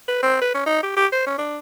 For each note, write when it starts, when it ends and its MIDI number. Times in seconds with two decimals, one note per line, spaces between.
0.08 0.18 71
0.23 0.37 60
0.41 0.51 71
0.54 0.64 61
0.66 0.81 63
0.83 0.93 67
0.96 1.06 67
1.12 1.23 72
1.26 1.35 61
1.38 1.58 62